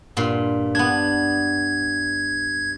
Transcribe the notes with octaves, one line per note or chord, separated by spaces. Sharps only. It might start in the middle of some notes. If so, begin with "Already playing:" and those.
G2 A#2 C6
B3 D4 G#6